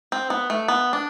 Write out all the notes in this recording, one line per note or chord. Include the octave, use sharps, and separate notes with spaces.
C4
B3
A3
B3
D4